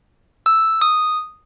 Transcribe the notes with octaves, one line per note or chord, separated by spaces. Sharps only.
E6
D#6